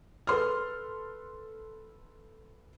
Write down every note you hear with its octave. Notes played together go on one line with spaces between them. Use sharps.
A4 B4 C6 F6